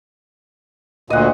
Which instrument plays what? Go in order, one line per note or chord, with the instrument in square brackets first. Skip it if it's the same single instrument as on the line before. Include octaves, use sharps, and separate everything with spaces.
[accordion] D2 A#2 [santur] D#5 F#5